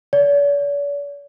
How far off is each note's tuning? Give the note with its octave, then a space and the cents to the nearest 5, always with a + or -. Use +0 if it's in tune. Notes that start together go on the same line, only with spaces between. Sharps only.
D5 -45